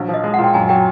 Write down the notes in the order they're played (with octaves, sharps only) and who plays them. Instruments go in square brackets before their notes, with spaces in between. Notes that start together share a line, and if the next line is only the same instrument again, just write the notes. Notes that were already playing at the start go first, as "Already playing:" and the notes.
Already playing: [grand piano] A#1 F#3
F3
[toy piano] D#5
[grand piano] G#3
[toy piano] F#5
[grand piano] A#2
[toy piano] G5
[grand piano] F#2 [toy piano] G#5
[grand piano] F#3 [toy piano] G5